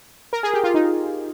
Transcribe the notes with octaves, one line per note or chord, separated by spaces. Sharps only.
A#4
G#4
G4
F4
D#4